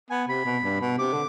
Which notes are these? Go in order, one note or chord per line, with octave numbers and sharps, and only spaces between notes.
B3 G#5
C3 B5
B2
G2
B2
C3 D6
D3